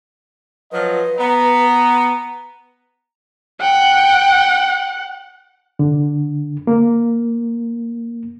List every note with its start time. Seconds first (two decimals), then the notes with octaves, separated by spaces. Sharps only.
0.72 F3 F#3 F4 B4 D#5
1.18 B3 A#5
3.61 F#5 G5
5.79 D3
6.67 A#3